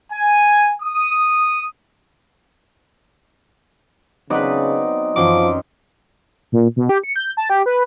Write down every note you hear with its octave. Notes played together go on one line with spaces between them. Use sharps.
G#5
D#6
C#3 F#3 B3 C4 D#4 B4 D5
F#2 E3 F3 G5 C6 D6
A#2
B2
G4
C#7
G6
A5
G4
B4